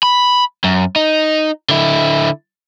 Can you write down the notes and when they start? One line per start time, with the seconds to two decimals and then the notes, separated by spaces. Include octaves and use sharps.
0.03 B5
0.64 F#2
0.96 D#4
1.69 D3 E4